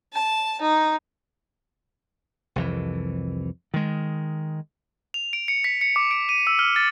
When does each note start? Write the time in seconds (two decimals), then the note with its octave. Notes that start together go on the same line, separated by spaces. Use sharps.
0.13 A5
0.61 D#4
2.56 C2 F2 E3
3.74 D#3 G#3
5.14 F7
5.33 D7
5.48 C#7
5.64 B6
5.81 C#7
5.96 D6
6.11 D7
6.29 D#7
6.47 E6
6.59 F6
6.76 A6